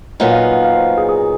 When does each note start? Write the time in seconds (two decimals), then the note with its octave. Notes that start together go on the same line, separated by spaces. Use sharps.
0.20 A#2 F#3 B3 D#4 F#5
0.32 F5
0.43 F#5
0.53 F#5
0.64 F5
0.75 C5
0.98 G#4
1.09 G#4